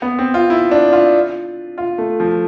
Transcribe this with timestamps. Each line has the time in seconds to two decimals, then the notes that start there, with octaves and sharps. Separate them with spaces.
0.02 B3
0.19 C4
0.34 F4
0.50 E4
0.71 D4
0.93 F4
1.78 F4
1.98 A3
2.20 F3